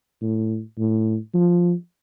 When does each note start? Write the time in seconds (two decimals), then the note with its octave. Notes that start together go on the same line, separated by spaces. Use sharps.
0.22 A2
0.78 A2
1.34 F3